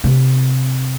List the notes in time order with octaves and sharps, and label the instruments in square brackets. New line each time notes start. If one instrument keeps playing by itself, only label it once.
[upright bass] C3